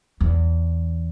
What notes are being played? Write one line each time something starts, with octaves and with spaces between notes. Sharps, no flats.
E2 E3